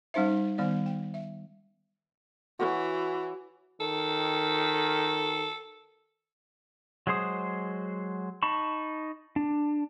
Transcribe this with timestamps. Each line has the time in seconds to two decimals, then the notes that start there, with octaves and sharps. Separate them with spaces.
0.14 G3 C#4 D#4 C5 E5
0.28 D#4
0.58 D#3 G3 B3 D5
0.86 G5
1.14 E5
2.59 E3 F#4 C#5
3.81 D#3 A4
7.07 F#3 G#3 G#4 C5 D#6
8.43 D#4 A5 B5 C#6
9.36 D4